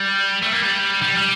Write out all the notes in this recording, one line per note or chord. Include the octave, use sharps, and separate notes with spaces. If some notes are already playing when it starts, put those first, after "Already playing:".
Already playing: G3
A3
A#3
G3
G3
G3